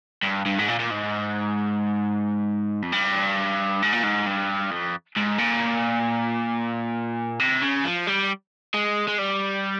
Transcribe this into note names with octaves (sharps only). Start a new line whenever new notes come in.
G2
G2
G#2
A#2
A#2
G#2
F2
G2
G#2
A#2
G#2
G2
F2
G#2
A#2
C3
C#3
F3
G3
G#3
G#3
G3